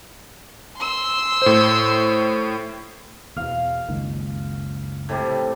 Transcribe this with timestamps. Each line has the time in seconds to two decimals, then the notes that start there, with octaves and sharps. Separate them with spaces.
0.78 C6 E6
1.42 A2 C5
3.37 E2 B2 F5
3.88 F#1 C#2 D#3
5.09 A2 C3 G3